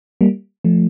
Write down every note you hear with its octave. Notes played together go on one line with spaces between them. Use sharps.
G3 A#3
F3 A3